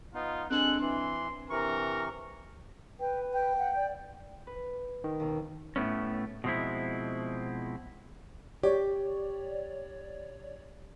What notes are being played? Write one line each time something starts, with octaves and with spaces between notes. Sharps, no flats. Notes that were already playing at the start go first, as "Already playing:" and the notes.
B3 D#4 F4
G#3 C4 D4 A4 G#5 F#6
E3 C6
C3 E3 A#4 C#6
B4 G5
G5
F#5
D5
B4
D#3
D#2 B2
A2 A3 B3 C#4
B2 F3 G#3 C4 E4
G4 C#5 D5